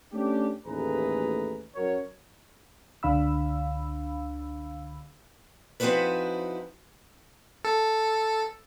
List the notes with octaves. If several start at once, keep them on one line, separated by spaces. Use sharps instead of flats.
A3 C#4 D4 G4
A1 D#2 A2 G#4 B4 A#5
F#2 C#4 F#4 A#4 C#5
C#2 D3 D4 F5 B5 E6
F3 C4 D#4 E4 F#4 B4
A4